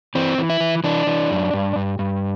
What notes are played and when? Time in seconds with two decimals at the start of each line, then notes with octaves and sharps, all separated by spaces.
0.15 E3 C4
0.38 E3
0.50 E4
0.60 E3
0.84 E3 D4
1.07 E3
1.30 F#2
1.54 G2
1.76 G2
1.99 G2